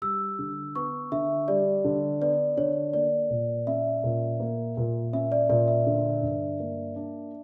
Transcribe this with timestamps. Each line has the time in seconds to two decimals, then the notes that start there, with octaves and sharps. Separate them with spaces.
0.02 G3 E6
0.39 D3
0.75 B3 C#6
1.12 D3 E5
1.48 G3 D5
1.84 D3
2.21 B3 D5
2.57 D3 C#5
2.93 A#3 D5
3.30 A#2
3.67 C#4 E5
4.04 A#2
4.40 A#3
4.77 A#2
5.13 C#4 E5
5.32 D5
5.49 A#2 D5
5.68 E5
5.87 D3
6.23 G2
6.60 A#3
6.96 D4